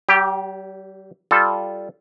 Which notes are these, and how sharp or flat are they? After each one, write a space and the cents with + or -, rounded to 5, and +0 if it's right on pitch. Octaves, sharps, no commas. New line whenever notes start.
G3 -45 G4 +0
G3 +0 F4 -5 A4 -10